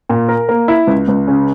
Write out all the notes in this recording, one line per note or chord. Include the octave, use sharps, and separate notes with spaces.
A#2
A#4
A#3
E4
C#2
C#2
C#3